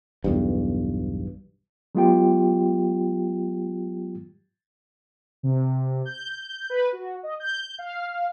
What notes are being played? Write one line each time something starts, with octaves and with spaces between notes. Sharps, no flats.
B1 E2 G2
F#3 G#3 B3 F4 G4 G5
C3
G6
B4
F#4
D#5
G6
F5